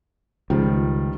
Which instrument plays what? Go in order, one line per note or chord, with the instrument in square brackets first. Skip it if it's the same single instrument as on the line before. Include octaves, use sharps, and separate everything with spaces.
[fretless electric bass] C#2 [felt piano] D#3 F3 G3